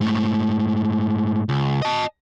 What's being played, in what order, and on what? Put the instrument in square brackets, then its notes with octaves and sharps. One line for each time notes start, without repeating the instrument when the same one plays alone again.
[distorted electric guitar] G#2 A3
C#2
D#5 A5